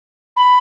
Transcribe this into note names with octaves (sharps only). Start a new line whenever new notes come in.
B5